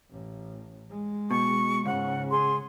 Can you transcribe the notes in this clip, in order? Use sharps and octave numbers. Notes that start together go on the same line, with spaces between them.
A1 A2
G#3
B2 C#6
C#2 G#2 C#3 F#5
G#4 C6